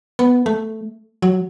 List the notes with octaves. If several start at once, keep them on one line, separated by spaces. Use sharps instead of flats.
B3
A3
F#3